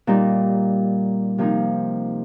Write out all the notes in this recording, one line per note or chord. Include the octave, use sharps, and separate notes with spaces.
A#2 G3 D#4
C3 F3 A#3 D#4